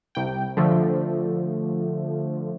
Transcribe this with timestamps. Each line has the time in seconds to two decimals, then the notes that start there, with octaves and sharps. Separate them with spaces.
0.15 C2 G5
0.57 D3 F3 A3